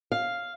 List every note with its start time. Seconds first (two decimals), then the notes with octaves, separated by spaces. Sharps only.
0.12 F5